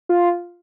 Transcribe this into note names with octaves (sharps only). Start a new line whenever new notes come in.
F4